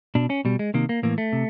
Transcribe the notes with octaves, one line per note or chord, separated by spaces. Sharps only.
B2 D4
C#4
B2 G3
G#3
C3 D#3 A#3
A#3
A2 E3 A#3
A3
C3